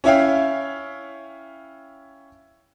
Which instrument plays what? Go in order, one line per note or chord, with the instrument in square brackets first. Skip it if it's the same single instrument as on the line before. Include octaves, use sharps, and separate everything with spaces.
[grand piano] C#4 E4 C#5 E5 F5 G5